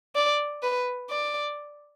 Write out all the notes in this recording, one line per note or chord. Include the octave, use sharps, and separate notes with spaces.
D5
B4
D5